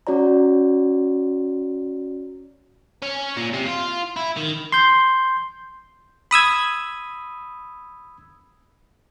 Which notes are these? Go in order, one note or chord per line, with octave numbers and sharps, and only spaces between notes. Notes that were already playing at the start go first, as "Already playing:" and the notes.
C#4 F#4 C#5 D5 A#5
C#4
A#2
C3
F4
E4
D#3
C6 G6
B5 D#6 E6 G#6